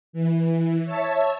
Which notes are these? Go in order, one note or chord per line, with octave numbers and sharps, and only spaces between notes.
E3
C#5 E5 A5